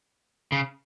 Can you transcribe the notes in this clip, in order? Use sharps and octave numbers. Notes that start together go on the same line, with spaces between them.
C#3